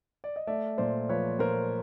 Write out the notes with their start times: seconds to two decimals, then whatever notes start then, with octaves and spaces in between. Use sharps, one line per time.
0.24 D5
0.36 D#5
0.47 A3 D5 E5
0.78 A#2 C5 D5
1.09 F3 B4 C#5
1.39 A#2 A#4 C5